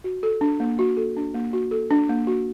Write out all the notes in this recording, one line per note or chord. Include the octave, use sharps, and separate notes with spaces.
F#4
A4
D4
A#3
F#4
A4
D4
A#3
F#4
A4
D4
A#3
F#4